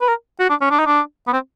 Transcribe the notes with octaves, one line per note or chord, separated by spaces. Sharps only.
B4
A#4
F#4
D4
C#4
D4
D#4
D4
B3
C4